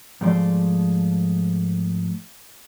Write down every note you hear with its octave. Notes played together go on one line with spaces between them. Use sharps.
G#2 F3 A3 G#4 D5 C6